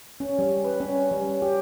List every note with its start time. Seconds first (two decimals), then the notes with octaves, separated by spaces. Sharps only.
0.20 C#4
0.39 G3
0.64 B4
0.80 C#4
1.12 G3
1.42 G4